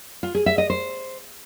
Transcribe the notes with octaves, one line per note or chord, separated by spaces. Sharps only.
F4
G#4
E5
D#5
C5